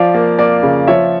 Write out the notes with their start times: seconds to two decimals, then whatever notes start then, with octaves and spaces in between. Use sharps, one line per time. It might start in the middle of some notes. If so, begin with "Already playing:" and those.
Already playing: F3 D5 F5
0.15 A#3
0.39 A#3 D5
0.63 C#3
0.88 F3 C#5 E5